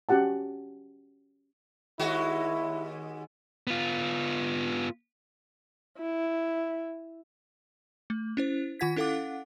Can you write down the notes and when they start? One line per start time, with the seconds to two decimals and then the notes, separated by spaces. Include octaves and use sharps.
0.09 C#4 F#4 G4 F#5 A5
1.99 D#2 G#3 E4 F#4
3.67 B3 F4
5.98 E4
8.10 A3
8.37 C#4 E4 C5
8.79 D#3 F4 F#5 G#6 B6
8.96 C#4 E4 A4 F5 F#5 D6